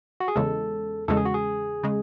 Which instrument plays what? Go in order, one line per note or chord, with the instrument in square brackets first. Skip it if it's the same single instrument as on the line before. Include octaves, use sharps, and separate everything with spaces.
[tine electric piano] F#4
G#4
[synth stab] E2 C#3 G#3 [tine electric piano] A4
[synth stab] E2 C#3 G#3 [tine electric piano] A4
[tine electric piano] G#4
F#4
G#4
[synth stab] C#3 G#3